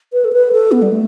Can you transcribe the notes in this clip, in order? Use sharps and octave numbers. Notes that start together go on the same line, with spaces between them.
B4
A4
B4
A4
B3
G3
A3